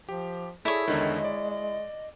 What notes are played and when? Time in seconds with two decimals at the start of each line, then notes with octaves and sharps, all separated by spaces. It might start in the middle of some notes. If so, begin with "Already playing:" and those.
0.09 F3 G4
0.65 E4 G#4 A4 C#5 D5
0.88 E2 D3 D#3 G#3 D#5
1.24 D5